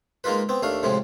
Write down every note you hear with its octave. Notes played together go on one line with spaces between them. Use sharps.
G#3 A#3 D#4 F4 B4
B3 C4
D#2 A3 D4 F5
A2 C3 F3 G#3